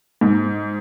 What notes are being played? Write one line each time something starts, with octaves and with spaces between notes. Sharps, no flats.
G#2